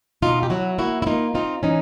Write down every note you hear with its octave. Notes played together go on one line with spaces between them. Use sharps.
B2 D#4 F4
G4
F#3 E4 F#4
A#3 E4 F#4
E4
A#3 D#4 F4
C4 D#4 F4
E3 C#4 D#4